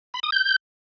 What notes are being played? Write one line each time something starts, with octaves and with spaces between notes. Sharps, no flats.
B5
D#6
G6